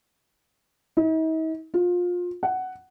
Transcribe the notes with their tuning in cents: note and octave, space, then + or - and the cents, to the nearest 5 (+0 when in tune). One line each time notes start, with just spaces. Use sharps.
D#4 +45
F4 +25
F#5 +10